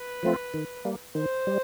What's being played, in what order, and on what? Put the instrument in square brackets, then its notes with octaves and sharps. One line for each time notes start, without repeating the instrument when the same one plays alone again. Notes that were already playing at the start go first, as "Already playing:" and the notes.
Already playing: [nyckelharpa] B4
[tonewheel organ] F3 A3 C4 F4
D#3
G3 A#3
[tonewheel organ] D#3 [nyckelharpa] C5
[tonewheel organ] G3